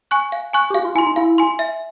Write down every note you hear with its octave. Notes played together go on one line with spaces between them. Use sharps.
G#5 C#6 F#6
F5
G#5 C#6 F#6
G4
F#4 F5
F4
E4 G#5 C6
D#4
E4 F5
G#5 C6
E5